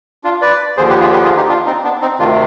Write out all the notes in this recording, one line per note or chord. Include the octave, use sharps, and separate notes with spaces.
D4 F4
B4 D5
D#2 D3 F3 G#4 C5
G4 B4
F4 G#4
G4 B4
F4 G#4
D#4 G4
D4 F4
C4 D#4
B3 D4
C4 D#4
D2 C3 D#3 D4 F4